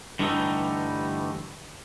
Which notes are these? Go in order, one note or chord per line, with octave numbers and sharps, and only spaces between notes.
G2 D3 E3 G3 A3 D#4